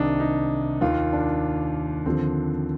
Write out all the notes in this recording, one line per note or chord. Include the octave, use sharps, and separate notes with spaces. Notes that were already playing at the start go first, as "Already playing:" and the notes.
Already playing: C2 C3 D#3 D4 D#4
D#4
D#2 D#3 F4
D4
D#2 D3 F3 C4